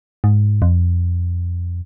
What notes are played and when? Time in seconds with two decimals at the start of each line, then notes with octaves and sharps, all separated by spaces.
0.24 G#2
0.62 F2